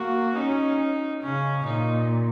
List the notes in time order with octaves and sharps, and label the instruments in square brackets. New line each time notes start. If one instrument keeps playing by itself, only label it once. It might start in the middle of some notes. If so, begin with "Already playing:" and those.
Already playing: [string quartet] A#3 [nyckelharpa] F#4
[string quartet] C#4 [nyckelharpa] D#4
[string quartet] C#3 [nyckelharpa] C#4
[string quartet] A#2 [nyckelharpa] D#4